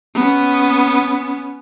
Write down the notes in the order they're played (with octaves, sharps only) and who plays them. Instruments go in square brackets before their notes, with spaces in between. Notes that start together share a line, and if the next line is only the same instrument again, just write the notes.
[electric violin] B3 C#4